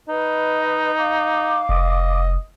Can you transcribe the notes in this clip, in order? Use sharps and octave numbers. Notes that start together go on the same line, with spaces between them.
D#4 B4 D#5
F5 D6
F1 D#5